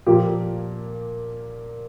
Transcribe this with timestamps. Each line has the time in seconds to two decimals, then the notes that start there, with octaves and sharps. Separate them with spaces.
0.06 A#2 F3 A#3 G4